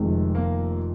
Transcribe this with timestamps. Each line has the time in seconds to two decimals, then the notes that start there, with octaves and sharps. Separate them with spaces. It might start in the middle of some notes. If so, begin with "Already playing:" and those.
Already playing: F1 F2 C3 D#3 G#3
0.35 A#3